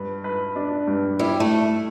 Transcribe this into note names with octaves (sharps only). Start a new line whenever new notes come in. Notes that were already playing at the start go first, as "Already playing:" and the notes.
Already playing: G2 B4
B4
D4
G2
G3 E4
A3